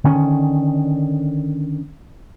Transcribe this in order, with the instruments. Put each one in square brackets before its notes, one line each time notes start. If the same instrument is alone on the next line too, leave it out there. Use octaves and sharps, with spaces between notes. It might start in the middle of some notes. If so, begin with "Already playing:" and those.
[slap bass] D3 D#3 C#4